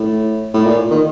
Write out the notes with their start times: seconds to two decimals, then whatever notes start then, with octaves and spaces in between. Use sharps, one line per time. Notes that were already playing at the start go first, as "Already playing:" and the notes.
Already playing: A2
0.54 A2
0.65 A#2
0.91 D#3